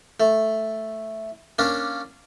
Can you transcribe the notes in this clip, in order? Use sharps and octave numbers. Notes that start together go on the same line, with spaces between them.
A3
A#3 C#4 D4